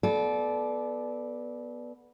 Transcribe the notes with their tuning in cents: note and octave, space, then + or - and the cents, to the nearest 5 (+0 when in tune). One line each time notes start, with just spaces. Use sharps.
B3 -10 A4 -35 D5 +0